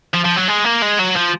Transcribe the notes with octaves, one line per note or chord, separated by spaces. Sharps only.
F3
F3
F#3
G#3
A#3
G#3
F#3
F3